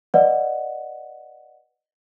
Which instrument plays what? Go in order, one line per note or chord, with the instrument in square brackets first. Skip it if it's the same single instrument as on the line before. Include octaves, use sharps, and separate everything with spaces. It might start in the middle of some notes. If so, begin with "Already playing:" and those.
[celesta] B4 D5 D#5 F#5